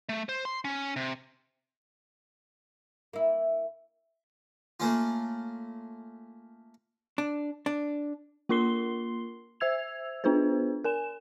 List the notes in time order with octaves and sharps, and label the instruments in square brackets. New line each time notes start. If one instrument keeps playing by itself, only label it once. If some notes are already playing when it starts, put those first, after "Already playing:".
[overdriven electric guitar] A3
C5
C6
C#4
C3
[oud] A#3 E4
[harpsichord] A3 A#3 C#4 F4
[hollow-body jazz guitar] D4
D4
[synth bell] A#3 F4 A#4 C6 C7 G7
C5 E5 E6 G#6 F7
B3 D4 F4 G#4 B4 C5
A#4 G#5 E7